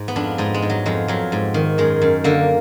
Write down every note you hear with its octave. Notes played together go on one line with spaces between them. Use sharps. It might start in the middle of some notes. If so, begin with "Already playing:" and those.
Already playing: G#2
B3
F2 D4
G#2 D#4
G#3
G#2
F#3
F2 G#3
F2 F#3
G#2
D#3
F#2 G#3
F#2
D3 A#3